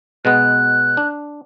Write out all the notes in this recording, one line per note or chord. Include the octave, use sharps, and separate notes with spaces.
B2 G#3 B3 F#6
D4